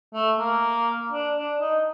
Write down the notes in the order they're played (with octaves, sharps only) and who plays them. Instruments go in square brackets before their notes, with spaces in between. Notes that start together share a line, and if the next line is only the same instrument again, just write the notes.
[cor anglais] A3
A#3
D4
D4
D#4